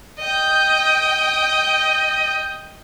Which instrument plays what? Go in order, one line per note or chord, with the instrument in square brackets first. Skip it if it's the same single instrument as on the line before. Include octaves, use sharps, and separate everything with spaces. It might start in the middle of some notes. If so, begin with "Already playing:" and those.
[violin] D#5 G5